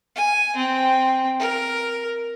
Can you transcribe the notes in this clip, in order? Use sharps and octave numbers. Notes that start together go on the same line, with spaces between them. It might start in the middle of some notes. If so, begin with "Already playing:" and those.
G#5
C4
A#4